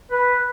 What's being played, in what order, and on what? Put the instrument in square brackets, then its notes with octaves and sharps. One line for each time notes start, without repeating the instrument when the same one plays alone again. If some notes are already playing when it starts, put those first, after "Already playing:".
[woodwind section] B4